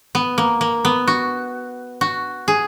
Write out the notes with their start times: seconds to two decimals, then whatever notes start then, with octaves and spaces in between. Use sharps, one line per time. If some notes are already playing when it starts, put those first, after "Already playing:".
0.15 B3
0.38 A#3
0.61 A#3
0.85 B3
1.07 F#4
2.01 F#4
2.48 G#4